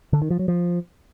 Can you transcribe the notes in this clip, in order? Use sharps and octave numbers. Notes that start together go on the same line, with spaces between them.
D3
D#3
F3
F#3
F3